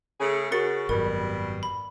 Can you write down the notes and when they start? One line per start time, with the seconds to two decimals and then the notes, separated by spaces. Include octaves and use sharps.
0.19 C#3 A3 G#4
0.52 C#3 F#4 A#4 A6 C#7
0.89 G#1 F#2 B2 G3 A#4
1.63 B5